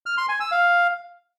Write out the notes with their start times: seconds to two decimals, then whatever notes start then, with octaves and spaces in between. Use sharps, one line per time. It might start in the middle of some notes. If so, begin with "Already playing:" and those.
0.06 F6
0.17 C6
0.29 G#5
0.40 E6
0.52 F5